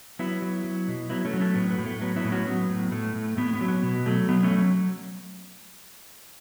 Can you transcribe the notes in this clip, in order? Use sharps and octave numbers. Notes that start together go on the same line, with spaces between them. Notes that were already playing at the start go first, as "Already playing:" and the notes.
F#3 B3 E4
F#3
F#3
B2
F#3 B3 E4
A3 C#4
F#3
A3 C#4
A2 B3
B3
A2
A3
F#3 B3
B3 E4
A2
C#4 F#4
F#3 B3
A2
A2 A3
A2
A2 B3
B3
F#3
B3
B2 B3
F#3 A3
F#3 B3
A3 C#4
F#3